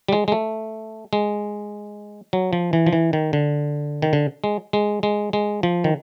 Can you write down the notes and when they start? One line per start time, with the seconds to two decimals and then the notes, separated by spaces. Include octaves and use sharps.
0.09 G3
0.13 G#3
0.28 G#3
0.32 A3
1.13 G#3
2.33 F#3
2.53 F3
2.73 E3
2.86 F3
2.93 E3
3.13 D#3
3.33 D3
4.02 D#3
4.13 D3
4.44 G#3
4.73 G#3
5.03 G#3
5.33 G#3
5.63 F3
5.84 D#3